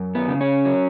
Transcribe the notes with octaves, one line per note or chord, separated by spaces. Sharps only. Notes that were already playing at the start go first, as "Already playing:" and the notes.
Already playing: F#2
B3
C#3
C#4
F#3